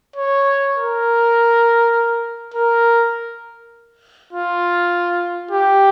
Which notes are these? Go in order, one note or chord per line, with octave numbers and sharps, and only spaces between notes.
C#5
A#4
A#4
F4
G4